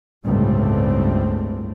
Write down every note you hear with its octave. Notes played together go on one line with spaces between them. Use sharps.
G1 C#2 A2 G3 A3 C4